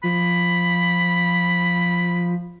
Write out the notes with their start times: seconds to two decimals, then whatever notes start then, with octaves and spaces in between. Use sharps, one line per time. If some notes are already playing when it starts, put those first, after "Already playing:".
0.03 F3 B5